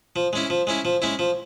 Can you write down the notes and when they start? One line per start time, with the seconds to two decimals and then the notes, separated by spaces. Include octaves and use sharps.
0.16 F3
0.33 G#3 C#4 E4
0.50 F3
0.67 G#3 C#4 E4
0.85 F3
1.02 G#3 C#4 E4
1.19 F3